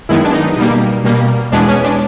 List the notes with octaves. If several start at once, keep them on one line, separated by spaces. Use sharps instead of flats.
F#2 D#3 G#3 B3 E4
D4
D#4
B2 G3 A#3
B2 G3 A#3
E2 B2 G#3 B3 D4
C#4
D4